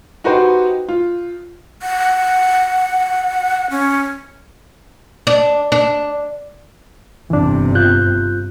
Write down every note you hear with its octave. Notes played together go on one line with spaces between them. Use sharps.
D#4 F#4 G4 B4 C5
F4
F#5
C#4
D4
D4
G1 C3 E3 D4
F4 F#6 G6